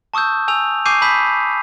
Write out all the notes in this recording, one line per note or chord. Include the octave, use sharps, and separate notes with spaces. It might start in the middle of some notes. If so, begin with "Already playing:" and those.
A5 C#6 D#6 E6 G6
G#5 E6 F7
G#5 C#6 D6 G6 C7 D#7
A5 B5 D#6 G6 B6